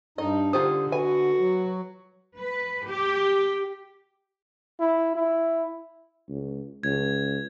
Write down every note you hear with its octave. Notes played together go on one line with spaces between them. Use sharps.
G2 D#4 D#5
D3 D#4 F4 G4 C5 D#6
F#4 B4 G#5
F#3
B4
G4
E4
E4
C#2
C#2 G#6